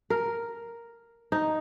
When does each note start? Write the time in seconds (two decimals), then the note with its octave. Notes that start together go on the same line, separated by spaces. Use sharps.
0.10 A#4
1.32 D#4